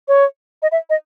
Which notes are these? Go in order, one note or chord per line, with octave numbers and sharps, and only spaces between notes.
C#5
D#5
E5
D#5